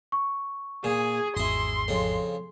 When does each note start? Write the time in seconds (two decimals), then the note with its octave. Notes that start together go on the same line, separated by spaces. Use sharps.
0.12 C#6
0.84 A#2 G#4
1.37 G#1 E2 G#2 E4 D#5 C6
1.88 F2 C#3